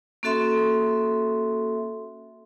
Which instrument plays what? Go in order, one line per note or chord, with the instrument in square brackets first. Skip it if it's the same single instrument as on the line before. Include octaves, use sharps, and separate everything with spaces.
[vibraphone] A#3 C#4 F#4 A4 E5 C6